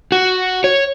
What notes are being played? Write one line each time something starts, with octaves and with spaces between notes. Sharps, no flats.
F#4
C#5